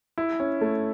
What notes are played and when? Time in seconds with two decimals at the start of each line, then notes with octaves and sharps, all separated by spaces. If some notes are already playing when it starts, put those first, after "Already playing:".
0.18 E4
0.40 C#4
0.61 A3